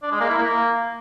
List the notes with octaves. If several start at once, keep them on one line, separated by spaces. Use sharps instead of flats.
D4
G#3
A#3
E4
A#3